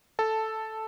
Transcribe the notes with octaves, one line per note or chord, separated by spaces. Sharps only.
A4 A5